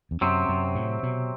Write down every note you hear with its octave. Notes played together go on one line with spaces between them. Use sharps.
E2
F#2 C3 F#3 C4
F#2
A2
B2